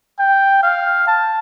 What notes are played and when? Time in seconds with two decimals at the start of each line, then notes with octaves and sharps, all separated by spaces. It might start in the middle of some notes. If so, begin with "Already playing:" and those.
0.19 G5
0.63 F5
1.07 A5